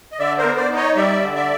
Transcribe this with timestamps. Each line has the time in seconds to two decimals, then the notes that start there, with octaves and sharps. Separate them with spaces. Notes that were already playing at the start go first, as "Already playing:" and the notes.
0.12 D#5
0.19 D3 D5 E5
0.38 A#4 C5
0.44 B3
0.57 C5 D5
0.70 D#4
0.77 C#5 D#5
0.96 G3 D5 E5
1.22 D3
1.35 D5 E5